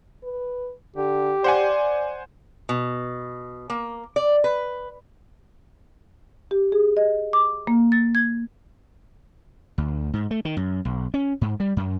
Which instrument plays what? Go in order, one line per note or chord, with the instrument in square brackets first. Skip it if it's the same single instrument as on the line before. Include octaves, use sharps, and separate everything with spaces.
[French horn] B4
[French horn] D3 [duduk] G4
[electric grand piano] C5 F#5 G#5 [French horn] D5
[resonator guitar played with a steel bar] B2
A#3
D5
B4
[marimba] G4
G#4
D#5
D6
A#3
A6
G#6
[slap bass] D2
G#2
A3
D#3
F#2
B1
C#4
G#2
G3
F#2